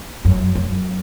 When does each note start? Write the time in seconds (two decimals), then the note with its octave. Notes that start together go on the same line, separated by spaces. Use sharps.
0.25 F#2
0.55 F#2